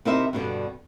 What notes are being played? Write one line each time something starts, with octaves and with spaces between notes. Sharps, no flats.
C3 D#4 E4 A#4 C5 E5
G2 B2 D3 G3